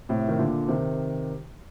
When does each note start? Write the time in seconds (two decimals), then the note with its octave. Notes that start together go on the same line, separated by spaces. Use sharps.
0.09 A2 C3
0.28 D#3
0.39 A#2 D3
0.68 C3 D#3